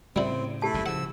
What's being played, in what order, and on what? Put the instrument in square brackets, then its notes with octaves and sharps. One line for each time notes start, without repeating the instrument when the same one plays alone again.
[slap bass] A2 C#3 [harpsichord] G3 E4 [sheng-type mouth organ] C4
[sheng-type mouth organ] A3 E4 [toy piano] G4 A5
[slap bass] F#1 E2 B2
[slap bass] C#3 F3 [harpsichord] F#5 [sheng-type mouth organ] E6